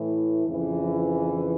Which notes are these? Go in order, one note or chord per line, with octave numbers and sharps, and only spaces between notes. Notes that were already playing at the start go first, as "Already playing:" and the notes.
Already playing: A2 E3
F2 C#3 E3